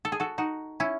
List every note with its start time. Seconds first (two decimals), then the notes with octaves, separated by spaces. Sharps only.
0.05 A4
0.12 G#4
0.20 F#4 A4
0.38 D#4 F#4
0.80 C#4 E4